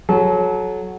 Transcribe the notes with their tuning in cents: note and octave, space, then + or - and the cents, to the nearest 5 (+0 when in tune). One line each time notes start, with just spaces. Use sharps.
F#3 -5 A4 -40